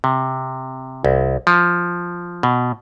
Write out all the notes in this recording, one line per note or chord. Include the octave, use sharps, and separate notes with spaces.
C3
C2
F3
B2